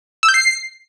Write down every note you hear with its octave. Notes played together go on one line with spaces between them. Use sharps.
E6
G6
C7